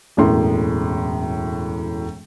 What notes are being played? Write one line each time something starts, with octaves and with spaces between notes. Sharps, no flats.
E1 F#2 A2 C6